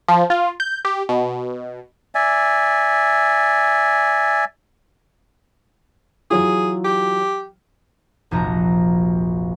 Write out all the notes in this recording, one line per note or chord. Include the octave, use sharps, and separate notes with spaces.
F3
F4
G6
G4
B2
D5 E5 G#5
E3 F#3 F4 G#4
G4
F1 A#1 F3 F#4 A#5